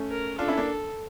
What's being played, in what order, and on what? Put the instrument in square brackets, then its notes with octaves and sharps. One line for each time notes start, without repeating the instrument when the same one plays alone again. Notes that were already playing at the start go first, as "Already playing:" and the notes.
Already playing: [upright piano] A3 C#4
[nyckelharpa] A#4
[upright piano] D4 F4 [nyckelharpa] A4
[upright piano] C#4 E4
A#3 D4